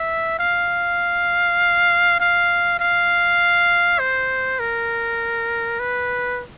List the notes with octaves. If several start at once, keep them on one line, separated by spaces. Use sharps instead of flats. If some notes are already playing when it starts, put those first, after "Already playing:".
Already playing: E5
F5
F5
F5
C5
A#4
B4